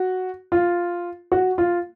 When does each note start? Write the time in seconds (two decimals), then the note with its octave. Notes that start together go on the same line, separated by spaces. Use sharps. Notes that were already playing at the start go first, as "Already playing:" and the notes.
Already playing: F#4
0.52 F4
1.32 F#4
1.58 F4